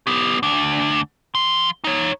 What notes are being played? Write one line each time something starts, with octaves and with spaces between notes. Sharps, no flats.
B3 G4
D2 D4
F3 C6
D#4 C#5